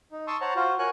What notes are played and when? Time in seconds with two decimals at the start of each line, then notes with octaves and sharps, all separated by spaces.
0.12 D#4
0.27 A5 C6 C#6 D#6 E6
0.41 C5 C#5 F#5 A5 A#5
0.56 F4 F#4 C5
0.79 A#4 C#5 F#5 G#5 F#6